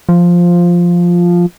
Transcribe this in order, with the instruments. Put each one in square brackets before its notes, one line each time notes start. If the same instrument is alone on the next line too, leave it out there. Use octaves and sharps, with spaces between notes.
[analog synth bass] F3